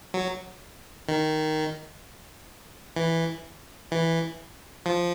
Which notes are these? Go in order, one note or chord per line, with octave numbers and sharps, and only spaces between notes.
F#3
D#3
E3
E3
F3